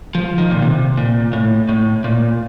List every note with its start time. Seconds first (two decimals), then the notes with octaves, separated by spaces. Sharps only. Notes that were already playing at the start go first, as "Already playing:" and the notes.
0.15 F3
0.38 D#3
0.51 A#2
0.62 C3
0.97 A#2
1.33 A2
1.69 A2
2.04 A#2